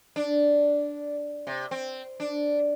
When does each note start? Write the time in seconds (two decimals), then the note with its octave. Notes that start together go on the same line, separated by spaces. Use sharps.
0.16 D4
1.47 C3
1.71 C4
2.20 D4